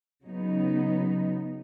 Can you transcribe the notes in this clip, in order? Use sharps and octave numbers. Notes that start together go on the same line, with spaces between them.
C#3 F#3 B3 D#4